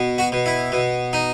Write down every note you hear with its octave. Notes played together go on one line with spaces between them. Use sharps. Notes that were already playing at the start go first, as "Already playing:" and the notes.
Already playing: B2
F#4
B2
E4
B2
D#4